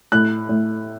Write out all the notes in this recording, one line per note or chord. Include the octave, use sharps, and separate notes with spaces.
A2 F#6
A2